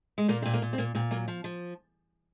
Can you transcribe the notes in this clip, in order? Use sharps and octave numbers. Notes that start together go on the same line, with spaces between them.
G#3
A#2 A#3
A#2 C4
A#3
A#2
C4
A#2 A#3
A#2 C4
F#3 A#3
F3
F3